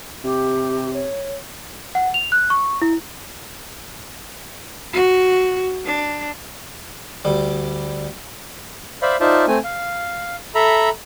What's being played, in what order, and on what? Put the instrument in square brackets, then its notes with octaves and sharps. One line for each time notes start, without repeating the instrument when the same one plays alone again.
[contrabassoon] C3 [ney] G4
[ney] C#5
[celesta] F#5
F7
F#6
C#6
E4
[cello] F#4
D4
[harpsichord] D2 G3
[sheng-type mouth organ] C5 D5 E5 F5 B5
D#4 F4 C5 D5 E5 A5
A3 C4 G#5
F5
A4 E5 A#5 B5